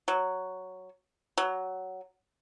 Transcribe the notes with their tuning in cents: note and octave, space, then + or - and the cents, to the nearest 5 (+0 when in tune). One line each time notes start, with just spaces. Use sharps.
F#3 +0
F#3 +10